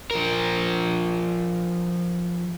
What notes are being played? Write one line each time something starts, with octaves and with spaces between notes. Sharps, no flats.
F3 A#4